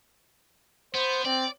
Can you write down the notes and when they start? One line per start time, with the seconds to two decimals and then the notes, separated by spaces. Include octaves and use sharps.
0.94 B3 C5
1.25 C4 D5